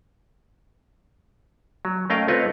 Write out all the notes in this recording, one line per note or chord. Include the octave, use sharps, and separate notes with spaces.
F#3
A3 C#4 A#4 D#5 F5 G5
A3 C4 F4 B4 C#5 D#5